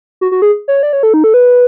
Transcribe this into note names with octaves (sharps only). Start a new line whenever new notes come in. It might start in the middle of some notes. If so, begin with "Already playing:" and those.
F#4
F#4
G#4
C#5
D5
C#5
A4
D#4
A4
B4